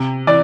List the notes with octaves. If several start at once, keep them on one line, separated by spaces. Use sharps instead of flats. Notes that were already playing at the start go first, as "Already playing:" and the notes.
Already playing: C3
E3 D5